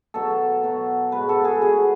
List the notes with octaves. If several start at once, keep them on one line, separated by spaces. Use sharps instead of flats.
B2 F#3 A4
B2 F#3
G#2 F#3 B4
A4
G#4
B2 F#3 G#4